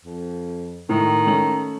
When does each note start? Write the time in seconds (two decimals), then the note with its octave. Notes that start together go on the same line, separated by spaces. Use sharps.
0.05 F2
0.89 A2 D#3 A3
1.27 A3 C#4 F#7